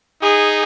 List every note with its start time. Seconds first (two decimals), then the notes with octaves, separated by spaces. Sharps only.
0.22 D#4 G#4